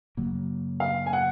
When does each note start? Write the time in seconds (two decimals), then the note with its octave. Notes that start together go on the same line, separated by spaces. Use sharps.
0.17 F#2 C#3 F#3 A#3
0.80 F5
1.06 G#5
1.13 F#5